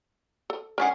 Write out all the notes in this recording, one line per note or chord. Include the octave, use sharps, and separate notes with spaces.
A4
G#3 C#4 G#4 A#4 D5 F#5